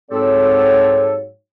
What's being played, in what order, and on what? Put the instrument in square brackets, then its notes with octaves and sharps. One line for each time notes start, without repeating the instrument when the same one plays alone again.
[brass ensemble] G#2 F#3 C#5 [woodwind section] C4 G4 A4